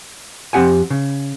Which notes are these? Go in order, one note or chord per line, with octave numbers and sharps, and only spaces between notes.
F2 C4 G4 F#5 G#5
C#3